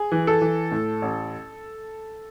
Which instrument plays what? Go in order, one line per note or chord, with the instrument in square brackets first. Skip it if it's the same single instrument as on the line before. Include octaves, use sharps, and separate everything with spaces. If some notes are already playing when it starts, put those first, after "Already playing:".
Already playing: [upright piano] G#4
E3
A4
E3
A2
A1